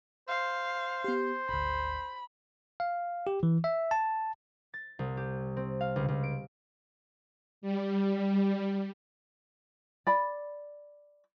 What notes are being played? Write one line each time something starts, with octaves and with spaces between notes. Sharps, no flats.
C5 F5
B3 G4
G#1 D2 B5
F5
G4
E3
E5
A5
A6
C2
G4
C4
F5
C#2
C#2
D7
G3
D5 B5